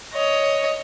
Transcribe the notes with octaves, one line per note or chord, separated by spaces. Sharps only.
C#5 D#5